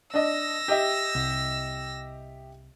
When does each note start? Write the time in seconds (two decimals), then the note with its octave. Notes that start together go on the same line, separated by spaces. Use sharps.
0.14 D4 D#5 E6 A#6
0.68 G4 D#5 E5
1.15 C2